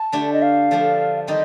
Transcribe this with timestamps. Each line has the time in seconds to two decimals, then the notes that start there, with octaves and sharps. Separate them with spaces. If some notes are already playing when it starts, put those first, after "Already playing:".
Already playing: A5
0.12 D3 A3 D4 G4
0.32 D#5
0.42 F5
0.71 D3 F3 A3 D4
1.27 D#3 G3 C4 D#4 G4 D#5